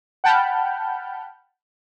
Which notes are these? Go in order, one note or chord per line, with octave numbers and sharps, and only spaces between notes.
F#5 G5 A5 B5 F6 G6